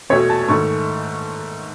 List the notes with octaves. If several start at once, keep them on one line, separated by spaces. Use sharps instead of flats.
E2 B2 A3 C#5
A5
G#2 D#3 A3 C#6